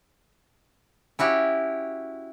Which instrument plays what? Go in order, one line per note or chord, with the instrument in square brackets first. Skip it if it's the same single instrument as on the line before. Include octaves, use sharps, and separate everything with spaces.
[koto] C#4 E4 F#4 G4